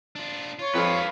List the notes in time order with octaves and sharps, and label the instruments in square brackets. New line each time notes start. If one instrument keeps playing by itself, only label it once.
[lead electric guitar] D4 F4
[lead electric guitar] F4 [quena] C#5
[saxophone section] F2 [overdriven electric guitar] B4 F5